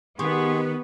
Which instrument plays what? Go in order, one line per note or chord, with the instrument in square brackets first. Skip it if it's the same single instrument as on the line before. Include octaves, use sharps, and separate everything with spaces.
[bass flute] D#3 [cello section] B3 [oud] G4 [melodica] G#4 C6 C#6